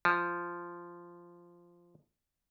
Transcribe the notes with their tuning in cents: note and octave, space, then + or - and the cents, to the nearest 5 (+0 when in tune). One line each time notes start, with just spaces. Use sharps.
F3 -10